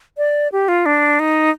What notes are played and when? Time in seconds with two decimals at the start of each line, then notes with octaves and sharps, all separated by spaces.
0.18 D5
0.52 G4
0.68 F4
0.86 D4
1.19 D#4